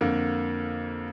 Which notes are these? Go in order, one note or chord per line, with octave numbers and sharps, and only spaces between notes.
F2 D3 A#3